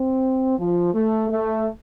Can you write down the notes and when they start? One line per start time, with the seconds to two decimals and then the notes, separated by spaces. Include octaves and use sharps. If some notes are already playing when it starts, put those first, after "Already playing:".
Already playing: C4
0.58 F3
0.94 A3
1.30 A3